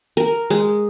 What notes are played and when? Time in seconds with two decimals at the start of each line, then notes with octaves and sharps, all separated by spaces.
0.17 A#4
0.50 G#3